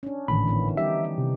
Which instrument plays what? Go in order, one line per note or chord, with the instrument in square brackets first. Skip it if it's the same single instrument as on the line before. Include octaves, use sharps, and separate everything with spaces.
[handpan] C#4 D4
[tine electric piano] G#1 A2 B5 [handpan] D3 E3
[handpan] D#3 E3 B3
[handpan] G3 D#4 G4 [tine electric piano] E5
[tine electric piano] C3